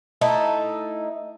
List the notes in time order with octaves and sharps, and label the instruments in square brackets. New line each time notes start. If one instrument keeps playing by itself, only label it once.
[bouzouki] A3 D#4 E4 A4